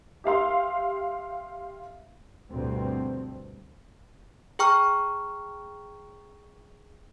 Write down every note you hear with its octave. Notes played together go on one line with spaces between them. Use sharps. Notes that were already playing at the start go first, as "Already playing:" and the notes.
G4 E5 F5 C6
D2 G2 B2 C4
G#4 G5 A#5 C#6 F6